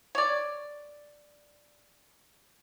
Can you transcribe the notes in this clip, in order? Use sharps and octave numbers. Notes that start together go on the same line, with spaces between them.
C#5 D5